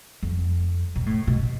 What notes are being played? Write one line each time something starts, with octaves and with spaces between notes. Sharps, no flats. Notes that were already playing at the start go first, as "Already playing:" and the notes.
F2
B2
A2
B2